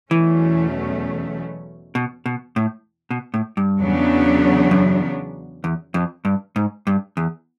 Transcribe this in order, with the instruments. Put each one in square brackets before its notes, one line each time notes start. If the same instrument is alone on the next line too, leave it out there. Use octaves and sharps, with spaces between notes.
[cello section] E2 B2 F#3 A3 C#4 [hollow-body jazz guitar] E3
[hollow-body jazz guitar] B2
B2
A2
B2
A2
G2
[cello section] E2 C#3 F#3 B3 D4
[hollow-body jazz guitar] F#2
E2
F2
G2
G#2
G2
E2